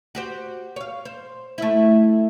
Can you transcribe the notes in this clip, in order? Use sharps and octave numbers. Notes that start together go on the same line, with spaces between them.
F#4 G4 C5
C#5 F5
C5
A3 E4